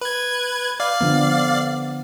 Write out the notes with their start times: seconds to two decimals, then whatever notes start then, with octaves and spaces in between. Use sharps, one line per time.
0.01 B4 G#6
0.80 D5 F5
1.01 D3 F3 B3